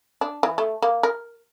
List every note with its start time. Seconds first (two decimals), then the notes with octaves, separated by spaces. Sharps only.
0.21 D4
0.43 E3
0.58 A3
0.82 A#3
1.03 A#4